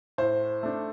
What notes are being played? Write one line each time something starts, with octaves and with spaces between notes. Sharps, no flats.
A2 C5
A3 D4